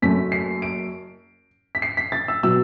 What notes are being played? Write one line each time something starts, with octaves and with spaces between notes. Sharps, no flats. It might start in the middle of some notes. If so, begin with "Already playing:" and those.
F#1 F#2 F#3 A3 B6
C7
D7
B6
C7
B6
A6
E6
B2 F#3 E6